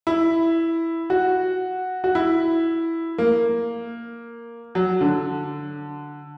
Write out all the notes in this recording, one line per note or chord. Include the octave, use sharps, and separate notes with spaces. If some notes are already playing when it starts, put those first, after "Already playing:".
E4
F#4
F#4
E4
A#3
F#3
D3